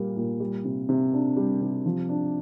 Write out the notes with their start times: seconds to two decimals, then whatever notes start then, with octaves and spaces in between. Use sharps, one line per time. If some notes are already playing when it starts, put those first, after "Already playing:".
Already playing: A#2 G3 A#3
0.17 A#2
0.40 G3
0.65 C3
0.89 C3
1.13 D4
1.37 G3
1.61 C3
1.86 F3
2.09 D4